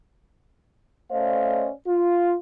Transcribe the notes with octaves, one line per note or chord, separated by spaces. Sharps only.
A3 C#4 C5 D5 D#5 F5
F4